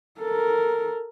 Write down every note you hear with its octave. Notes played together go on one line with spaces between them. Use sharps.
A4 A#4